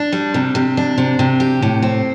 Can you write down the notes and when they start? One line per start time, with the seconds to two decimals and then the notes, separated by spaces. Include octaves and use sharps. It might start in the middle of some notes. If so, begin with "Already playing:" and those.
Already playing: D4
0.12 G3
0.34 C3
0.55 C3
0.77 D4
0.98 C3
1.19 C3
1.40 G4
1.62 A2
1.82 C4